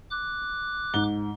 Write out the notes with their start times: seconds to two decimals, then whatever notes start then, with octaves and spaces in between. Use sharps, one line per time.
0.11 D6 F#6
0.94 G#2 G7